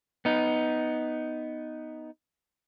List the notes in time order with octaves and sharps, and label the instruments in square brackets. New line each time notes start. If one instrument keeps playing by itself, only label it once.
[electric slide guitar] B3 D#4